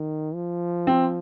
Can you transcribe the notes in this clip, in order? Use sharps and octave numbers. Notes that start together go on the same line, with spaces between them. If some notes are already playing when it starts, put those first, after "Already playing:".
Already playing: D#3
F3
C4